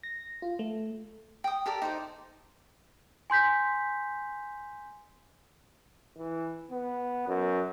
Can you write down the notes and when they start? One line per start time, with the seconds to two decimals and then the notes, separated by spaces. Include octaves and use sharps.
0.03 A#6
0.42 F4
0.59 A3
1.44 G5 D#6
1.66 G4 A4 A#4 D5
1.82 D#4 C5 D5
3.30 G#5 C6 G6 B6
6.17 E3
6.71 B3
7.27 F#2